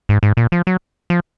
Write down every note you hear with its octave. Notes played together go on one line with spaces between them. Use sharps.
G#2
G#2
A#2
F3
F#3
F3